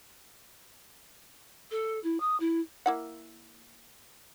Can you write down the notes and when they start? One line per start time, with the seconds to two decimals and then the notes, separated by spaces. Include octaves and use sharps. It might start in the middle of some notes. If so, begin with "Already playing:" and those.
1.71 A4
2.03 E4
2.20 D#6
2.40 E4
2.86 A#3 E4 F#5